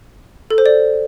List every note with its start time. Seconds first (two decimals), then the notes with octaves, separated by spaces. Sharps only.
0.50 A4
0.58 C5
0.66 D5